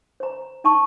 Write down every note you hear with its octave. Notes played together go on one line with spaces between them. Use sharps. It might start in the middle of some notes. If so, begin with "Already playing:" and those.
C5 A#5
D#4 A5 C#6